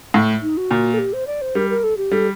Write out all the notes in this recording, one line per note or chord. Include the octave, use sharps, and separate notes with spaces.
A2
D#4
F#4
A#2
A4
G4
C5
D5
C5
G3 A#4
A#4
A4
G4
G3 A4